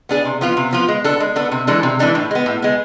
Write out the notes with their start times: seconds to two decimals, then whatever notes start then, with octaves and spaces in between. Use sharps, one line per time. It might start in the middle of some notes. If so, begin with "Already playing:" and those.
0.09 B3 D4 G#4
0.25 C3
0.41 F3 B3 F4
0.57 C3
0.73 F3 B3 F4
0.88 G#3
1.04 B3 D4 A4
1.20 G#3
1.36 B3 D4 A4
1.52 C3
1.67 E3 G#3 D4 A4
1.83 C3
1.99 E3 G#3 D4 A4
2.15 A2
2.31 G#3 B3
2.46 A2
2.62 G#3 B3